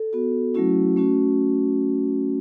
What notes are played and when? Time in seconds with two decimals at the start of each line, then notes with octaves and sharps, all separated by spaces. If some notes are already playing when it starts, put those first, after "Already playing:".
Already playing: A4
0.13 B3 F#4
0.54 F#3 A3 C#4 E4 F#4
0.96 A3 C#4 F#4